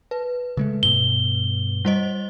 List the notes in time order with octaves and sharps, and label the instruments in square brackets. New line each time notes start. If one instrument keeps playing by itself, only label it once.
[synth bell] B4
[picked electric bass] C#3 G#3 A3
[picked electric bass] G2 B2 [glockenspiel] G7
[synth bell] G3 C5 D#5